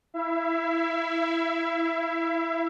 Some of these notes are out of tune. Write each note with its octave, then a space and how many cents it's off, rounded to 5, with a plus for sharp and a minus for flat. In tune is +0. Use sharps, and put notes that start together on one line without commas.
E4 +0 E5 +35